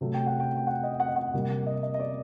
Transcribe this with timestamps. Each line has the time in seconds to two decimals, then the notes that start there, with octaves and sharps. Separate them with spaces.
0.01 C3 F#3 A3
0.14 G5
0.27 F#5
0.40 G5
0.56 G5
0.67 F#5
0.83 D#5
1.00 F#5
1.08 D#5
1.16 F#5
1.33 C3 G3 A#3
1.66 D#5
1.83 D#5
1.94 D#5
2.00 D5